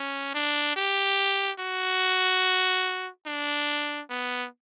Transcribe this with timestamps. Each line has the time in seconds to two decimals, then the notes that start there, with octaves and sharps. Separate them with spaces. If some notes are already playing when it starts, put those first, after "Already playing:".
Already playing: C#4
0.35 D4
0.76 G4
1.59 F#4
3.26 D4
4.10 B3